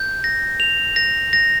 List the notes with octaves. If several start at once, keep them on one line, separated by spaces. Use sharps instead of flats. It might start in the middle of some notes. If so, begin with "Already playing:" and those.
Already playing: G6
A#6
F7
A#6
A#6